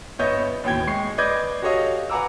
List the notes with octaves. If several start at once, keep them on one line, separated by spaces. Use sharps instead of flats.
G1 B3 C#5 D#5 E5 G6
A1 D#2 B2 G5 G#6
G#3 C#6 C7
B4 D5 D#5 D6 G6 G#6
F#4 G4 A4 C#5 D#5 F5
B4 F#5 G#5 A#5 D6 E6